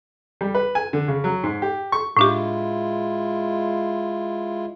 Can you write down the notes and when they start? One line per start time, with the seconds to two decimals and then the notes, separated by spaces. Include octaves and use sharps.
0.41 G3
0.55 B4
0.75 G#5
0.93 D3
1.08 C#3
1.24 F#3
1.44 G#2
1.62 G4
1.92 C#6
2.17 A2 G#3 D4 E4 F4 G4